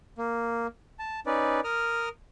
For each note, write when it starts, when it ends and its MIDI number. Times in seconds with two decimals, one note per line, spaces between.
0.18 0.67 58
0.99 1.20 81
1.26 1.60 61
1.26 1.60 63
1.26 1.60 71
1.26 1.60 74
1.64 2.09 70
1.64 2.09 87
1.64 2.09 89